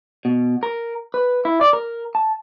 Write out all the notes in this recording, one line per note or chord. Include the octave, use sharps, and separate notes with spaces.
B2
A#4
B4
E4
D5
A#4
A5